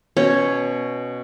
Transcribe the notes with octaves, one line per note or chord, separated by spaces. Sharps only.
B2 C#4 C#5